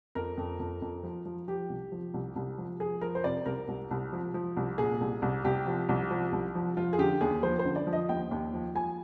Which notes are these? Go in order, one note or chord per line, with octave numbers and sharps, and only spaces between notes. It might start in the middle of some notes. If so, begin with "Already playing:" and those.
F2 A#4
F2
F2
F2
F3
F3
F3 G4
C2
F3
C2
C2
F3
F3 G#4
F3 A#4
C5
C3 D5
C2 A#4
C2
C2
F3
F3
C2
A#2 G#4
C2
C2
C2 G4
F3
C2
F3
C2
F3
F3 F4
G#4
D3 G4
D#2 G#4
F3 C5
C5
D3
D5
F3
D#5
D#2 G5
D#2
F3
F3 G#5